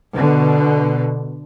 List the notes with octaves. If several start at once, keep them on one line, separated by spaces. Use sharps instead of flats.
B2 D3